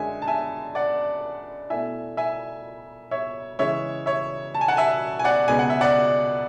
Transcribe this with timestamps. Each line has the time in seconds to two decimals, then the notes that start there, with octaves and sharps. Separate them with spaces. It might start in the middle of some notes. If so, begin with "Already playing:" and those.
Already playing: F#2 D3 G#3 E5 G#5
0.22 A5
0.28 E5 G#5
0.75 D5 F#5
1.70 B2 A3 E4 E5 G#5
2.17 E5 G#5
3.11 C#5 E5
3.59 C#3 E3 G#3 C#5 E5
4.06 C#5 E5
4.54 A5
4.61 G#5
4.68 F#5 A5
4.77 E5 G#5
5.19 G#5
5.24 D5 F#5
5.48 C#2 B2 G#3 B3 G#5
5.59 F#5
5.70 E5
5.81 D5 F#5